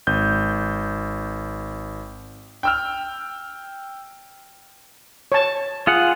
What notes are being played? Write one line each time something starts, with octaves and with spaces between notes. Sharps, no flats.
G#1 G6
G5 E6 F6
C#5 A5
F4 G#4 F#5